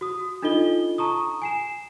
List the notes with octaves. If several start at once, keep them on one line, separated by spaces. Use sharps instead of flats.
F#4 D#6
D4 D#4 F4 A4 D#5 G7
A5 A#5 C#6 D#6
G#5 C7 E7